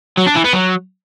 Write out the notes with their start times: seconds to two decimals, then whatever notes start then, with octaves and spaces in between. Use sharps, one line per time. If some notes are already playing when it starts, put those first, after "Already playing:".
0.18 F#3
0.27 D4
0.36 E3
0.44 B3
0.53 F#3